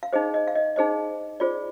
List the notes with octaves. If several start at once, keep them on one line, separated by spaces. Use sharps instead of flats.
F5
D#4 G#4 C5 D#5
D#5
F5
D#5
D#4 G#4 C5 D#5
F4 G#4 C5 D5